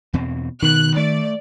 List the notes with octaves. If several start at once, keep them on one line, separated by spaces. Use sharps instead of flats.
E2 B2 C4
B2 D#3 F#6
A3 D5